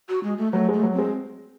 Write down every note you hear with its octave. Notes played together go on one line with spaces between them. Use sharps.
F#4
G#3
A3
F#3 A3
G#3 A3
F#3
C4
G#3